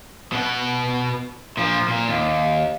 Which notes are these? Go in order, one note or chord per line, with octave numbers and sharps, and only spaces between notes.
B2 F#5
A#2 F3
A#2
D#2